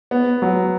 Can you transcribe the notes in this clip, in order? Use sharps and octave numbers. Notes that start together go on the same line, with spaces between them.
B3
F#3